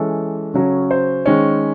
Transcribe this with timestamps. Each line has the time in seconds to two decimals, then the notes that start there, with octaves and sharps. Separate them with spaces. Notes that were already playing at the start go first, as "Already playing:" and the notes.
Already playing: E3 G#3 C#4 A4
0.54 C#3 F#3 C#4
0.91 C5
1.26 D#3 G#3 C#4